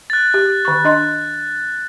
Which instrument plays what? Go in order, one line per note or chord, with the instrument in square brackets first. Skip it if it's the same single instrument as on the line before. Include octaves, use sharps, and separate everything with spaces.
[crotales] F#6 A6
[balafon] G4
D#3 C#6
D4 D#5 C6